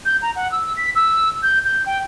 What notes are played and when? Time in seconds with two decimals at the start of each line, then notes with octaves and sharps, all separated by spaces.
0.05 G6
0.22 A#5
0.36 F#5
0.52 E6
0.77 B6
0.95 E6
1.43 G6
1.65 G6
1.86 G5